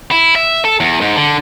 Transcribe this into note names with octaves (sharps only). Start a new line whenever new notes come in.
E4
E5
A4
E2
G#2
D3